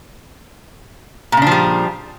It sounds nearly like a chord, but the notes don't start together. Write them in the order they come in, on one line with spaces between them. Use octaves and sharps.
A#2 C#3 D4 F3 G3